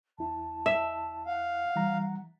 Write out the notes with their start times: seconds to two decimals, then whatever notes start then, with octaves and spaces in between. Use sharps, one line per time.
0.19 E2 E4 A5
0.66 E5
1.27 F5 F#5
1.76 E3 G3 A#5